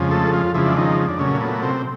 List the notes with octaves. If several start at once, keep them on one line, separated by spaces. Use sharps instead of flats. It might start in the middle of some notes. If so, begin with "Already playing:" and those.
Already playing: F2 C#3 F3 G#3
A3 A4
F3 F4
F2 C#3 E3 F3 G#3 E4
D4
D#3 D#4
D4
A#2 C#3 F#3 A3 C#4
B3
C3 C4